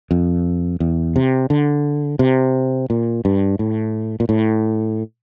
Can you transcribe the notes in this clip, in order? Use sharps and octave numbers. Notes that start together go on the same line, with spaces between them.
F2
E2
C3
D3
C3
A#2
G2
A2
A#2
A2